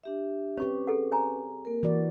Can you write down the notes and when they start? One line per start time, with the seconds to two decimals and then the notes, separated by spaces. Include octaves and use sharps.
0.04 D4 G4 E5
0.58 C4 C#4 G4 B4 C#5 C#6
0.87 G#4 A4 F#5
1.12 C#5 G#5 A#5
1.65 A#3 A#4
1.83 E3 F#4 D5